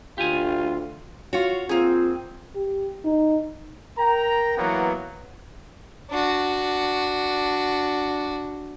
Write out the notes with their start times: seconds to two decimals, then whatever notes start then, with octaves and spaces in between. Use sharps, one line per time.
0.18 D2 F4 G4 G#5
1.33 F4 F#4 C#5
1.69 A#3 C4 F4 G#4
2.55 G4
3.04 D#4
3.98 A#4 G5 A#5
4.57 E3 F#3 A#3 B3
6.11 D4 F#4